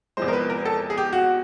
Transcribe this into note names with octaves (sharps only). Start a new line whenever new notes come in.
E2 C3 F3 G#3 C5
A#4
B4
A#4
A4
G#4
G4
F#4